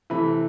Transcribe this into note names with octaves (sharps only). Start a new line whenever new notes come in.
C3 E3 A3 B5